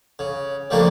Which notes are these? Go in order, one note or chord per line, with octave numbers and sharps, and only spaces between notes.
C#3
C#3 F3 G3 A3 A#3 D4